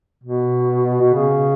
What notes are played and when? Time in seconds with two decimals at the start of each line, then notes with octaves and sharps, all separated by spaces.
0.24 B2
1.01 B2
1.14 C#3